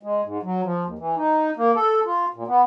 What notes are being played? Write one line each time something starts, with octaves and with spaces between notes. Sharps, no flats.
G#3
G#2
F#3
F3
D#2
E3
D#4
A#3
A4
F4
A#2
B3